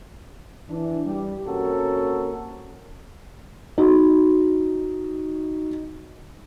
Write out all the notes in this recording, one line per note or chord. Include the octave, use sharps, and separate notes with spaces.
E3 D4
G3 G4
C3 A#3 C#4 F#4 A4 A#4
D#4 F#4